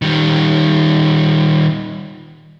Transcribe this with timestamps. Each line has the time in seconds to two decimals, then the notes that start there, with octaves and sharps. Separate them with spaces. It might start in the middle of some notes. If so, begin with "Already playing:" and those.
0.02 D#3 G3